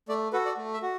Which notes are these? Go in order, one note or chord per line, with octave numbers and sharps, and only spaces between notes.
A3 D5
F#4 A4 B4
D5
A3
E5
F#4